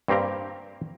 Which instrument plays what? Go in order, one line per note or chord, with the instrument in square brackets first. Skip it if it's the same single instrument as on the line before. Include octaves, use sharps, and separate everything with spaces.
[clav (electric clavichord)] G2 A#3 C4 G4 A#4